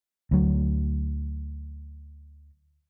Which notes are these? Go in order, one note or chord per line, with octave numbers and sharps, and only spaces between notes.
D2 F#3